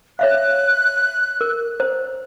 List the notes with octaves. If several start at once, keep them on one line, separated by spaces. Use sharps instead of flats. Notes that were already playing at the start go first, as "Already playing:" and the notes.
C#5 E5 F5 F#6
A#4
C5